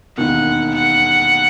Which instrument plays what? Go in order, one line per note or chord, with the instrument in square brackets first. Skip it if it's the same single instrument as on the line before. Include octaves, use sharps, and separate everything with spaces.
[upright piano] E1 D#2 D#3 [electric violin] F#5
[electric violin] F#5